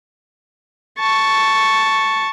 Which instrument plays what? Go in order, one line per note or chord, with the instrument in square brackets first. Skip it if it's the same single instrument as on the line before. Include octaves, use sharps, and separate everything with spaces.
[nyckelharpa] A5 C#6